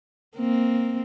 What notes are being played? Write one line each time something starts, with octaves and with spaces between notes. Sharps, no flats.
A#3 C4